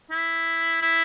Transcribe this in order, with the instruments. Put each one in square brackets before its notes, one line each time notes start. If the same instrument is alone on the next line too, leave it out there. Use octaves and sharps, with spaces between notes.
[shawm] E4
E4